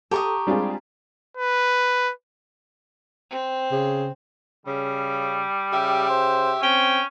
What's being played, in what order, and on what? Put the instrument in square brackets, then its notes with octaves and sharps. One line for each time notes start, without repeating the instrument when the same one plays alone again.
[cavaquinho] G4 C#6 D#6 [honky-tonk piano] A4 [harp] A5 A#5
[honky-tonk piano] G3 G#3 G#4 [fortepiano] C4 D4 F4
[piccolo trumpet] B4
[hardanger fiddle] C4
[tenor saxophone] C#3
[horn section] C#3 [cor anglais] G3
[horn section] C#3 G4 E5
[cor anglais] C5
[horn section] C4 G5 [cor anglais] C#4